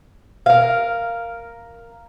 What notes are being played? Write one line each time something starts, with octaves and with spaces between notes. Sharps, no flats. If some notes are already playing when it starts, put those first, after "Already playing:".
A#4 F5